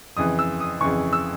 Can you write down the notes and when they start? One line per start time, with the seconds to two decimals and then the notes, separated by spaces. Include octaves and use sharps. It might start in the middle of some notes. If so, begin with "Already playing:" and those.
0.17 F2 C#3 E3 D#6
0.39 E6
0.60 D#6
0.81 F2 C#3 E3 C#6
1.13 E6